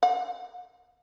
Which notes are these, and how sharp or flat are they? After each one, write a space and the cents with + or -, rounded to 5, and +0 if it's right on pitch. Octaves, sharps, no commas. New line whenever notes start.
F#5 -45